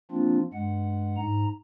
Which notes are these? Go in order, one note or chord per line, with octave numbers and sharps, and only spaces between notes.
F3 A#3 C4 D4 F4
G2 G#3 F#5
G#2 A#5